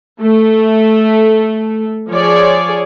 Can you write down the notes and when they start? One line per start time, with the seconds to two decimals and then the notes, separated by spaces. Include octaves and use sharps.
0.21 A3
2.10 F3 G#4 C#5 D5